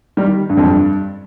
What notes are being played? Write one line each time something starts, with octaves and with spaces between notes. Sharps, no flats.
D#3 G3
G2
F2
G2